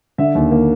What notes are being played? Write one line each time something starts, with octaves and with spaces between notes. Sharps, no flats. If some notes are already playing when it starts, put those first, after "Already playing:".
D3 E5
D#2
A#3